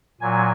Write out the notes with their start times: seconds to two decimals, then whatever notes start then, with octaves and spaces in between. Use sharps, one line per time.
0.21 A#2 F#3 G#5